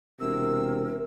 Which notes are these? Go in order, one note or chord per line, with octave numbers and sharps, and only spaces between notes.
E1 C3 A#4 E6